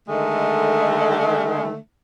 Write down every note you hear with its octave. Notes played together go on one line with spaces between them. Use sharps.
D3 D#3 G#3 A3